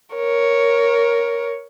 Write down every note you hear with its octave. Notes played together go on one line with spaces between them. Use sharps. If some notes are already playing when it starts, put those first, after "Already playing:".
A#4 C#5